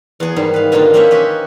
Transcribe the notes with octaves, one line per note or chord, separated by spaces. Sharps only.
E2 B3 G#4
G#2 D#3 G3
B4 F5
B2 D3 D#3 A#3 D#4 F4
A#3 C4 C#4 G4 C#5 E5
C#4 G4 B4 D#5